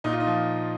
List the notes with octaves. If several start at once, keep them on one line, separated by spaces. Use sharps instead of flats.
A#2 D#4
F4
D#4
F3